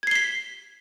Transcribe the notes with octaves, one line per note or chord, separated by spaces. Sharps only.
G#6 B6 C7 G7